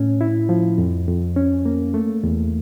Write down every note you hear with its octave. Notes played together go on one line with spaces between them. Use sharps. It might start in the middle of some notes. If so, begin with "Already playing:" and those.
Already playing: A2 C#4
E4
F3
F2
F2
C#4
A#3
A3
E2